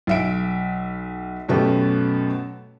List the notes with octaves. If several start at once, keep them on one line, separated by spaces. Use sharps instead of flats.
B1 E5 D7
F#2 B2 A3 B3 G4